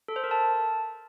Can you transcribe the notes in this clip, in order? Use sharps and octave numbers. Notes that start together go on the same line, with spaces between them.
A4
C5
A#4
A5